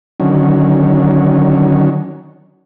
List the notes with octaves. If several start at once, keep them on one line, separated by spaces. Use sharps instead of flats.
D3 D#3 F#3 C#4